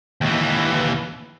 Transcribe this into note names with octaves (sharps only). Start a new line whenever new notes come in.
D#2 E3